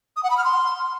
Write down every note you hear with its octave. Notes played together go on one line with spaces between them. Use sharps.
D#6
F#5
B5
F6
C6